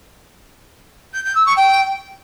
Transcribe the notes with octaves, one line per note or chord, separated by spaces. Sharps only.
G6
G6
E6
C#6
G5